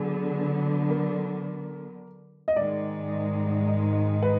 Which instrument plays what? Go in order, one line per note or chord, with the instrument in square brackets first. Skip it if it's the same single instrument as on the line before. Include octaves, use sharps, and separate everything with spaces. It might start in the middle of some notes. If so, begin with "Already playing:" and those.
Already playing: [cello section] D3 F#3 B3 D4 [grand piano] G#4
[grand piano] A#4
D#5
[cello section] G#2 D#3 G#3 D#4 [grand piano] D5
[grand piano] B4